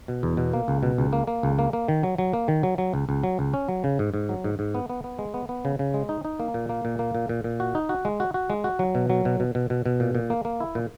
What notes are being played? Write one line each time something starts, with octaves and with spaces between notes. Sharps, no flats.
B2
E2
B2
A#3
C#2
B2
C#2
A#3
A#3
C#2
A#3
A#3
D#3
F#3
F#3
A#3
D#3
F#3
F#3
C#2
C#2
F#3
C#2
C#4
F#3
C#3
G#2
G#2
F#3
G#2
G#2
B3
B3
B3
G#3
B3
B3
C#3
C#3
G#3
D#4
D#4
A#3
A#2
A#3
A#2
A#3
A#2
A#2
A#2
F#4
D#4
F#4
G#3
F#4
F#4
G#3
F#4
F#3
B2
F#3
B2
B2
B2
B2
B2
A#2
A#2
A#3
A#3
E4
A#2